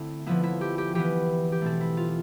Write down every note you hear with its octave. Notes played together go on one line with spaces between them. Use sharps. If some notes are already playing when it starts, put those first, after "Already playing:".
Already playing: D3 A3 C4 E4
D3 F3 B3 E4
E4
G4
G4
E3 B3 G4
G4
B2 A3 C4 A4
E4
F4